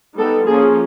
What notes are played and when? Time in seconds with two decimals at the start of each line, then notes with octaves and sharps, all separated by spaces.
0.18 G3 B3 D#4 A4
0.46 F3 A#3 C#4 F4 G#4